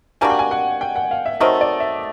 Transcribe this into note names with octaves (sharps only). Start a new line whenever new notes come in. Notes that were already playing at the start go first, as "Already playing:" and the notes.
G3 A#3 D4 F#4 G#5
G5
G#5
F#5
G5
F#5
F5
E5
D#3 F#3 A3 C4 D#5
D5
E5